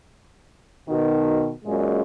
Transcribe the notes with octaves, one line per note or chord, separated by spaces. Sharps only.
B2 D#3
F#2 A#2 G#3